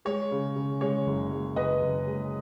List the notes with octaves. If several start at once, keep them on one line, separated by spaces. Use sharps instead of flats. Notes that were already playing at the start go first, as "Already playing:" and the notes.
G#3 C#5
C#3
C#3
G#3 C#5
F#1
G#3
F#1 B4 D#5
F#1
G#3